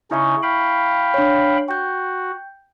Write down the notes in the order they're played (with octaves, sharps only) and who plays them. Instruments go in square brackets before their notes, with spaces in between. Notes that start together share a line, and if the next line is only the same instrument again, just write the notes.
[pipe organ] C#3 C#4 D#4 [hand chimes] E4 E5 C#6
[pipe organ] F5 G5 B5
[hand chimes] D4 C#5
[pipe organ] F#4 [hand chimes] G5 G6